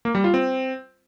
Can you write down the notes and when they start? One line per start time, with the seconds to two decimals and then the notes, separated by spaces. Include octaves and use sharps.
0.05 A#3
0.15 G3
0.24 F4
0.34 C4